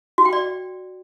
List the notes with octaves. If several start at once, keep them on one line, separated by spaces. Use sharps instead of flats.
F#4
G5
D5